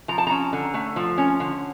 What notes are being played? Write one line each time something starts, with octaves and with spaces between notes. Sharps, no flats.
F3 A#5
A5
C#4 A#5
D3
A3
F3
C#4
D3